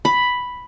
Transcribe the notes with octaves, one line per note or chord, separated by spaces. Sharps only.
B5